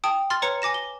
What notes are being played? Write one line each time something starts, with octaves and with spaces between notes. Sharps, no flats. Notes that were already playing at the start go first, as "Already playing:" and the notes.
G5 A5 D#6
C6 F6 A6
B4 C#5 A#5 C#7
G#5 D6 A#6 E7
G7